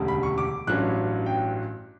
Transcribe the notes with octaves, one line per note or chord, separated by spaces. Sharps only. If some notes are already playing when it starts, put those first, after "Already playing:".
Already playing: E1 D2 C#3 G3
B5
C#6
D6
A1 G2 F#3 C#4 F#6
G5